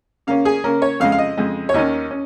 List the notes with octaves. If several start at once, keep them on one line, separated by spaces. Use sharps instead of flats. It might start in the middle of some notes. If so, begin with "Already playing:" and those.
C#3 A#3 C#4 F5
G#4
C#3 A#3 C#4 A#4
C#5
F2 C#3 G#3 F5
F5
D#5
F2 C#3 G#3
C#5
D#2 D#3 C#4 D#5
C#4